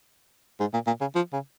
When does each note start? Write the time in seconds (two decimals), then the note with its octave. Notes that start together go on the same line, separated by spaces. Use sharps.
0.60 G#2
0.73 A#2
0.87 A#2
1.01 C#3
1.15 F3
1.33 C#3